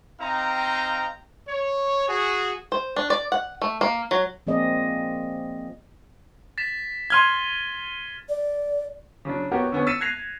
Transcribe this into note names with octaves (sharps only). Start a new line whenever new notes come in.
C4 D#4 F5 G5 A#5
C#5
F#4 G#4
C5
D4
D5
F#5
A3
A#3
F#3
F3 A#3 C4 G#4 D5 D#5
A6 B6 E7
C6 F6 G#6 D#7 G7
D5
C#3 F#3 D4
B3 F#4 G4 A#4 C#5 F#5
D3 B3 C#4
E6 A6 B6 C#7 D#7 E7
F#6 G#6 A#6 C7 F7